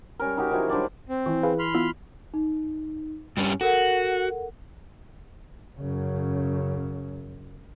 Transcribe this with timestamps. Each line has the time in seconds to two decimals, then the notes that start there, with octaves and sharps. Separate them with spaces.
0.19 G3 C#4 A#4
0.37 D#4 F#4 G4 A#4
0.51 D#3 F3 F#3 E4
0.69 G3 D4 C5 D5
1.09 C4
1.26 E3 C#6
1.43 G#4 B4 F5
1.59 B5 C6 F6
1.74 B3 E4 F4 E6
2.34 D#4
3.37 G2 G3 C#4
3.61 F#4 A4 A#4 F#5
5.79 F#2 C#3